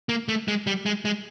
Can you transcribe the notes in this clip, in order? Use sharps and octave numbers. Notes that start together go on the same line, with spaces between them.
A#3
A3
G#3
G3
G#3
G#3